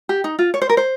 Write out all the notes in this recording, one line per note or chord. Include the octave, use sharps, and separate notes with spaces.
G4
D#4
F4
C#5
C5
A#4
C5